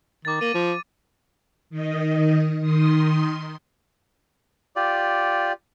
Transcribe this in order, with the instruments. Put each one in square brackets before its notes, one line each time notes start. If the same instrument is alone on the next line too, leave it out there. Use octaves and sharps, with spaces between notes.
[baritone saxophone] D#3 [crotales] D6 A6
[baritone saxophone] A#3 [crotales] D#7
[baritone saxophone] F3
[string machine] D#3 D#5
D#3 C6 D#6
[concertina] F4 G4 D5